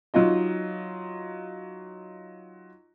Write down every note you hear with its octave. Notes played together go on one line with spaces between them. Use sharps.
F#3 D#4 F4 D#5